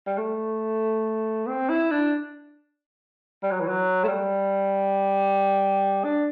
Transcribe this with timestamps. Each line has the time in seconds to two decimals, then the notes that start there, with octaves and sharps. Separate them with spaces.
0.06 G3
0.18 A3
1.47 C4
1.69 E4
1.91 D4
3.43 G3
3.51 F#3
3.60 E3
3.68 F#3
4.04 A3
4.08 G3
6.04 D4